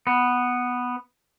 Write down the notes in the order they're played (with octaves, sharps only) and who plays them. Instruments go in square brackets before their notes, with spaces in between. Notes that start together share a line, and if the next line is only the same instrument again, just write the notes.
[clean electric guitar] B3